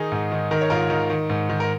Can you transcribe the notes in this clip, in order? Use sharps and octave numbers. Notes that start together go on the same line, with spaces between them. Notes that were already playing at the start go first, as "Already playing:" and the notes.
Already playing: D#3 D#4 G#4
G#2
D#3
D#3 A#4
C#5
G#2 F4 A#4
D#3
D#3
G#2
D#3
A#4